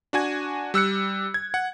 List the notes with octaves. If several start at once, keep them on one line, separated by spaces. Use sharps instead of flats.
D4 F#4 G#5 G#6
G3 E6 F#6 C#7
G#6
F#5